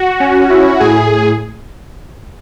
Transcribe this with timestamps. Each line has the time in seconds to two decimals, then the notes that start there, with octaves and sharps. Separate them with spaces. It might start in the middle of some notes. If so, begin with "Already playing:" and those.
Already playing: F#4
0.20 C#4
0.50 E4
0.80 A2 G#4